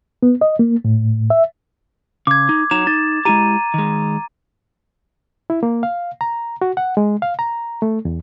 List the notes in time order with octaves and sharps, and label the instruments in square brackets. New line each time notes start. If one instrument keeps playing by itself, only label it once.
[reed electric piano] B3
D#5
A#3
A2
E5
[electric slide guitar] C#3 [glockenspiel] D6 G#6
[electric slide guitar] D#4
[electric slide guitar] F#3 D#4 A#5 [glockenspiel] E7
[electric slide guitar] D#4 [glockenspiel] A6
[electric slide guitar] G#3 E4 G4 [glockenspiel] A#5 D#7
[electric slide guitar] D#3 G#3
[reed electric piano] E4
A#3
F5
A#5
F#4
F#5
G#3
F5
A#5
A3
E2